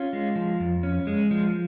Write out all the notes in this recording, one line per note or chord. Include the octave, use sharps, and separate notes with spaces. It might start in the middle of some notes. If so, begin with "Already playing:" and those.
Already playing: C#4 F4
G#3
F3
F2
C#4
G#3
F3